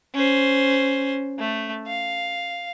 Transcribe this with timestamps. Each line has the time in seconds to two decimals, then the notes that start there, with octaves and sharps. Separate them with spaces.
0.15 C#4 C5
1.39 A3
1.87 F5